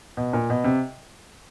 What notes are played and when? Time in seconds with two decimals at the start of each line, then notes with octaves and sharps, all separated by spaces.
0.17 B2
0.33 A#2
0.50 B2
0.64 C3